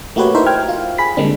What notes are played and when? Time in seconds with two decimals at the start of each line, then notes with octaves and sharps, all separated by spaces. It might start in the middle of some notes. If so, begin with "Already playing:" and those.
0.16 A3 A#3 F#4 G4 B4 C#5
0.35 D#4 E4 A#4 C5 E5 B5
0.46 G5 F6 G#6
0.69 F4
0.98 G#4 B5 B6
1.17 D3 G3 G#3 A#3 C4 D4